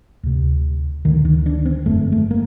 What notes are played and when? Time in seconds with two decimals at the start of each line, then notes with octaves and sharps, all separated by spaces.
0.23 D2 C3
1.05 D2 D3 D#3
1.25 D#3
1.46 D4
1.65 C4
1.85 G1 F2 D3 A3
2.12 A3
2.31 A#3